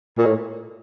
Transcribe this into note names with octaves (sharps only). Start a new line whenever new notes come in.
A#2
A2